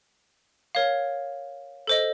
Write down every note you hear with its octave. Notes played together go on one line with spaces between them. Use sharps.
A#4 C#5 F5
A4 C5 D#5